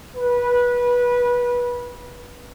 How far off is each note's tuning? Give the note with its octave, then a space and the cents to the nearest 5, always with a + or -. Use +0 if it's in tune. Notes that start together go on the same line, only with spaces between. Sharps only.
B4 -20